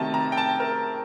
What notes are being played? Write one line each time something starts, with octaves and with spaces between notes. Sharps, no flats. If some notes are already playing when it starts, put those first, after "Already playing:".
Already playing: C3 D#3 F#3 A3 A5
A#5
G5
A5
A#4